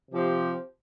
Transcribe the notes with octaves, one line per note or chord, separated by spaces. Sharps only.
C3 F3 C4 G4 C5